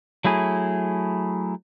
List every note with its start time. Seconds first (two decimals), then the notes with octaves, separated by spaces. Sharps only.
0.25 F#3 A3 E4 G#4